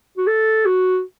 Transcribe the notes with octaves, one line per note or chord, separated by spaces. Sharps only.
F#4
A4
F#4